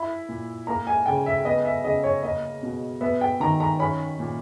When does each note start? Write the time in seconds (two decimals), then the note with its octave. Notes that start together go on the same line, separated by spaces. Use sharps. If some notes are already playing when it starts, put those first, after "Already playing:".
Already playing: E4 B5
0.29 A#2
0.67 A#3 A#5
0.87 G#5
1.06 C#3 G5
1.26 E5
1.45 B3 D#5
1.65 E5
1.84 C#3 D#5
2.04 C#5
2.23 A#3 D#5
2.63 B2
3.01 B3 E5
3.21 G5
3.40 D#3 A#5
3.60 A#5
3.79 C#4 B5
4.19 A#2